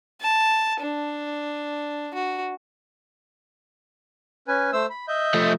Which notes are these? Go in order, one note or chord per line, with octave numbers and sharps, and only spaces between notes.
A5
D4
F#4
C#4 B4 G#5
A3 C5 E6
B5
D#5 E5 G6
F3 A3